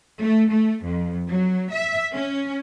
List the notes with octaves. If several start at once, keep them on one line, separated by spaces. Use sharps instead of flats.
A3
A3
F2
F#3
E5
C#4